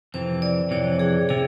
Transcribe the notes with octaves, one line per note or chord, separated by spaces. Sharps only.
F2 C3 E3 C5
D5
F2 C3 E3 C#5
G#4
C3 G#4